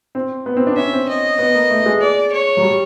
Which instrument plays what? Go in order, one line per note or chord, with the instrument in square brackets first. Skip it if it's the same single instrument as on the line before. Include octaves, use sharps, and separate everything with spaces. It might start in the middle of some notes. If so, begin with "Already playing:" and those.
[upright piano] C4
B3
C4
D4
[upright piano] C#4 [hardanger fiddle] E5
[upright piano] C4
[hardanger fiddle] D#5
[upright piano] B3
A#3
A3
G#3
[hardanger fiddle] D5
C#5
[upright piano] F#3
G3